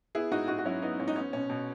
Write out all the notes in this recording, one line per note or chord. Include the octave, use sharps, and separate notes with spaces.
B3 E4 G#4
G#2 D#4 F#4
G#2 D#4 F#4
F#4
F#3 C#4 E4
B3 D#4
G#2 C#4
D#4
B3 C#4
B2 C#4
B2